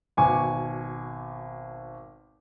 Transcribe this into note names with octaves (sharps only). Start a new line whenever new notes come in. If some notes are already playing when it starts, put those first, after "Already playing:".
G#1 B2 G#5 C#6 D6